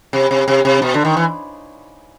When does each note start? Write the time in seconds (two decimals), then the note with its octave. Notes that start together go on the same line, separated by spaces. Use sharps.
0.13 C3
0.31 C3
0.48 C3
0.65 C3
0.82 B2
0.94 D3
1.05 D#3
1.17 E3